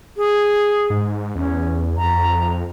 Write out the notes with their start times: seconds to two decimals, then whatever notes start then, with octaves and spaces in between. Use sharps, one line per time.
0.17 G#4
0.90 G#2
1.35 E2 C#4
1.97 F2 A#5